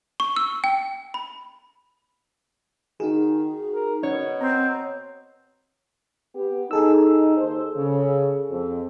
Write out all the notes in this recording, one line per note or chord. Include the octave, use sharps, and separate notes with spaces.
C#6
E6
G5
B5
D#3 D#4 F#4 G#4 E7
A#4
B2 C#4 C#5
C4 A#5
B3 G4
D#4 G#4 A4 E6
D#2 C5
C#3
F2